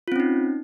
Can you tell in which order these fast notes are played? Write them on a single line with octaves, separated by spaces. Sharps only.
F4 C4 C#4 D#4